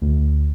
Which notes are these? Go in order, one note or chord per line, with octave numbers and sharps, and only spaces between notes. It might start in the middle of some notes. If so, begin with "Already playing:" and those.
D2